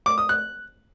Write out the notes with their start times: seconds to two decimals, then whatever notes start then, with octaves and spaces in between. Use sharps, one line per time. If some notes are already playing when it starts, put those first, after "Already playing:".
0.06 D6
0.18 D#6
0.29 F#6